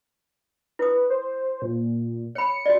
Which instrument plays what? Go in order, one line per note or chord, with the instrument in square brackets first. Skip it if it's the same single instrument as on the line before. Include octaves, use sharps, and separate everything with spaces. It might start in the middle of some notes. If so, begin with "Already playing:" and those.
[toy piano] E4 D#6 [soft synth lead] B4
[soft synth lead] C5
A#2
[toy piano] C#5 B5 [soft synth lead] C#7
[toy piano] F#4 D5